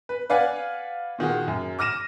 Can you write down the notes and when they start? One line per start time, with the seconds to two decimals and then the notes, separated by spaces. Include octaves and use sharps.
0.09 B4
0.30 B4 D5 F5 F#5 G#5
1.19 A#2 D#3 F#4 G#4
1.48 F#2
1.79 D6 F6 A#6 D#7 E7